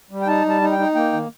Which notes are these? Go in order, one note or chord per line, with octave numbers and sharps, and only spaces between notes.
G3
G5
D#4 A5
G3 A5
D#4
G5
D#4
A#3 G5
D#3